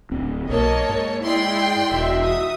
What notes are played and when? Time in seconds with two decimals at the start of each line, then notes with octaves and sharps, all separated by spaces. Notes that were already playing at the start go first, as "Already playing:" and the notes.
0.11 D1 C4
0.49 B1 A#3 C#5 D#5 A5
0.89 G#2
1.22 G#3 E4 D5 G5 C6
1.91 E1 D#4 F#4 E5
2.24 D#6